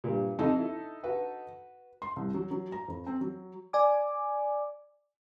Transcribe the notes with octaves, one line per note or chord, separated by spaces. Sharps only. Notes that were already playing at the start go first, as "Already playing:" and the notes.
G2 A#2
F2 D#4 A4 D#5
E4
F#4 B4
C6
C2
F#3
F#3
A#5
F2
C4
F#3
D5 G#5 D6